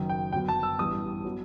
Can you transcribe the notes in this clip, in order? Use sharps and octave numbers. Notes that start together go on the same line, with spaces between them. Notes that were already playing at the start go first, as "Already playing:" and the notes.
Already playing: F#1 F#2 D#3
G5
G1 F#2 F#3 B3 G5
A5
E6
A1 G2 E3 B3 D#6
F#3 B3